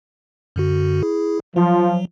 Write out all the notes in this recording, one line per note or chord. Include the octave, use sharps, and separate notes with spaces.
F#2 D3 F#4
E4 G#4
F3 F#3